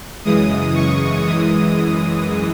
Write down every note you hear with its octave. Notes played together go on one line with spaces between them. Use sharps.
F#2 C#3 E3 G#3 D#6
C#6
F#2 E3 G#3 D#6